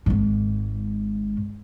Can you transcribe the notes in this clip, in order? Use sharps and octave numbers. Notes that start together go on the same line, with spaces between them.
G#1 G#2